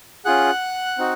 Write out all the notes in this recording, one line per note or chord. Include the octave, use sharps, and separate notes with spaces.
C#4 F4 G#4 F#5 F#6
C4 D#4 F#4